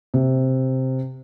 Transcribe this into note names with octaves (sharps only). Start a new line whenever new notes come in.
C3